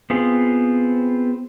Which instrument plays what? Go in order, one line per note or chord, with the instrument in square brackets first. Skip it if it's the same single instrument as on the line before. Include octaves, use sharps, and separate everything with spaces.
[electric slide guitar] B3 C4 F4 G#4